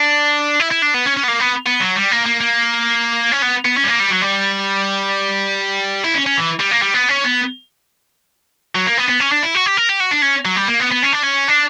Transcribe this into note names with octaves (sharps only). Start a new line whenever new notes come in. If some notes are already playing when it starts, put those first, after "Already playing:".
Already playing: D4
E4
E4
D4
B3
C#4
C#4
B3
A#3
B3
B3
F#3
G3
A#3
A#3
A#3
C#4
B3
B3
C#4
G3
A#3
G3
F#3
G3
E4
C#4
C#4
E3
G3
A#3
G3
B3
C#4
B3
F#3
A#3
B3
B3
C#4
D4
E4
F#4
G4
A#4
G4
F#4
D4
C#4
F#3
G3
A#3
B3
B3
C#4
D4
C#4
D4